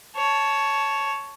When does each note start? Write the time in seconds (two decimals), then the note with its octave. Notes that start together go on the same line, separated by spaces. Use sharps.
0.16 C#5 A5